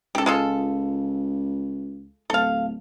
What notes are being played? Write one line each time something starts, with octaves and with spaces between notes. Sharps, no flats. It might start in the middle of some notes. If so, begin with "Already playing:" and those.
C#2 G4 A4
G#3 F4 A4
D1 A4 F5